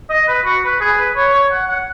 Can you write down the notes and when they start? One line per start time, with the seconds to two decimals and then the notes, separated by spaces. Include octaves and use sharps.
0.10 D#5
0.28 B4
0.45 F#4
0.64 B4
0.81 G#4
0.98 B4
1.16 C#5
1.33 C#5
1.51 F#5
1.69 F#5